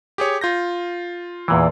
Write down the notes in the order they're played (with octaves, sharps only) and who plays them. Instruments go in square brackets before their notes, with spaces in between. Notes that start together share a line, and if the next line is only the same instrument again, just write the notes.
[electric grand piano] G4 G#4 C#5
F4 G6 A#6
[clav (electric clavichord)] E2 A#2 E3